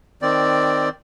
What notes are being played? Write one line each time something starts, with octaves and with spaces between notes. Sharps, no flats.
D#3 C4 D5